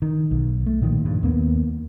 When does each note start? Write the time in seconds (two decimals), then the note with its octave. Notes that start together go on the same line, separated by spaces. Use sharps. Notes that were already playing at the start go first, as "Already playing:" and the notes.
0.02 D#3
0.31 B1
0.66 A3
0.82 A#2 D#3 F3
1.05 G2
1.23 D#2 A#3 B3